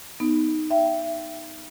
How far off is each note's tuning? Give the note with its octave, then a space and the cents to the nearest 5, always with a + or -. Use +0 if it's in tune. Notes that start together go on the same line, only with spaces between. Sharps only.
B3 +5 D#4 +0
E5 +30 G5 -25